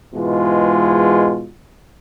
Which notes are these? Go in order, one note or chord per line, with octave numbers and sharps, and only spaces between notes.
G#2 B2 E3 G#3 F4